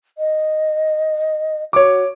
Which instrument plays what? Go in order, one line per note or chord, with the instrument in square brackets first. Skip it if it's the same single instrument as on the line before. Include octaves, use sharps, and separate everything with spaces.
[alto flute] D#5
[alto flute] F#4 [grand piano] C#5 D6